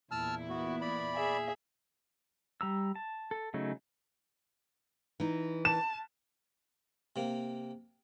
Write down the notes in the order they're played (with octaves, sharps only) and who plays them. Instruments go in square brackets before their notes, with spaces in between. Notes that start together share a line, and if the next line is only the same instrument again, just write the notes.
[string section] E2 A#2 E4 [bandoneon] A5 E6 F6
[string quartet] B3 [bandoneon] F#4
[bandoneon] D5 B5
[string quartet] G#4 E5
[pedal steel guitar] G3 A#5 E6
A5
A4
C#3 F#3 A3 C#4 D#4
[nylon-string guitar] E3 D#4
[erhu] A5 [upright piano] E7
[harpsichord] C3 A#3